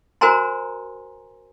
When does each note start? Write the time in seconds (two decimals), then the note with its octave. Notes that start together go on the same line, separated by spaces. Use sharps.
0.21 F#4 A#4 C5 G#5 A#5 C6